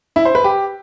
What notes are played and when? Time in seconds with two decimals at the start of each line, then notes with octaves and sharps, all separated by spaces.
0.16 E4
0.25 C5
0.35 B4
0.44 G4